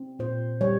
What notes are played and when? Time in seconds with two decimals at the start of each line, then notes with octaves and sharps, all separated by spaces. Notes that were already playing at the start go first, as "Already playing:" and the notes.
Already playing: C4
0.19 A#2 C5
0.61 G3 C#5